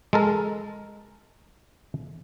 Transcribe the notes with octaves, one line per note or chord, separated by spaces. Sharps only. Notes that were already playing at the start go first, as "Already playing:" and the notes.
G#3 A4 A#4